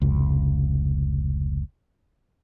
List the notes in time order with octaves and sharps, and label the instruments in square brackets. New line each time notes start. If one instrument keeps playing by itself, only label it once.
[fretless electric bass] F1 C#2